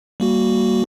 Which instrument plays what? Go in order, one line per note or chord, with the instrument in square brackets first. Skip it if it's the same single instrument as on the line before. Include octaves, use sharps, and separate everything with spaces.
[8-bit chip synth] G3 A#3 F#4